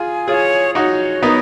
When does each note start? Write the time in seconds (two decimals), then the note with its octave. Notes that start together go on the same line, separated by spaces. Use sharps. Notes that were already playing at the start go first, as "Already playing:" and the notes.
Already playing: F4 G#4 G#5
0.28 F4 G#4 C#5
0.75 D#4 F#4 C#5
1.22 B3 D#4 A#4